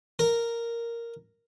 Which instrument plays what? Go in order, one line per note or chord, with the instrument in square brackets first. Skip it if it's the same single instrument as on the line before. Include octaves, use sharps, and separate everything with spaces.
[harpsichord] A#4